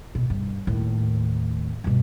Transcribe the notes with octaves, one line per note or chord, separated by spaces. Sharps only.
B2
G2
D#2 A2
G2 B2